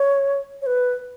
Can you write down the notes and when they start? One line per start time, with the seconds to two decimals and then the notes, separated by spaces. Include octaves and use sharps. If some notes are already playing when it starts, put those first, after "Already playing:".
Already playing: C#5
0.62 C#5
0.66 B4